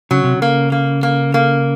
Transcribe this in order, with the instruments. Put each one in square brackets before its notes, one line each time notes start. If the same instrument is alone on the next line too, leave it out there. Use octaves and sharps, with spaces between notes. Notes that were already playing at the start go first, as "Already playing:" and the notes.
[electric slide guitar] C#3 [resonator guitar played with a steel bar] F#3
[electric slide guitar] C3
C#3
[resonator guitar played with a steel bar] A#3
A#3
A#3
A#3